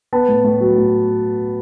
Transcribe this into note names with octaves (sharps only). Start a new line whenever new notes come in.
B3 A5
A2
A2
F#3
A2